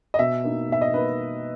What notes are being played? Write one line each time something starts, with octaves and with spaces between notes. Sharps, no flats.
D#5
B2 E5
A#3 D#4
B2 E5
D#5
A#3 D#4 B4